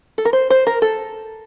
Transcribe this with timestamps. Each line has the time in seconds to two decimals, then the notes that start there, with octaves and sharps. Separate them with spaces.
0.18 A4
0.25 A#4
0.33 C5
0.50 C5
0.67 A#4
0.82 A4